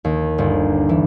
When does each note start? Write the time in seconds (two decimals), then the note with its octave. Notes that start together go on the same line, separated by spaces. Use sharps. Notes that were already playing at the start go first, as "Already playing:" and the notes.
0.05 D#2
0.38 G1
0.89 E3